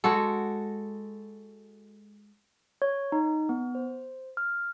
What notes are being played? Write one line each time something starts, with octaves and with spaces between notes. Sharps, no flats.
G#3 F#4 A4
C#5
D#4
B3
C5
F6